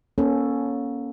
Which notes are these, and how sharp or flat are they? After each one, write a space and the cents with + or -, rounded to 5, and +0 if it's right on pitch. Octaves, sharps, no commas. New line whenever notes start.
A#3 +35 C#4 +0 A4 +0